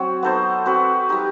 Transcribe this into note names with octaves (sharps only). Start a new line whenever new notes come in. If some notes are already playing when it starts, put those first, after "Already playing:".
Already playing: F#3 C4 F#4
B3 D#4 A4 C5
C4 F#4 B4
G3 D#4 G4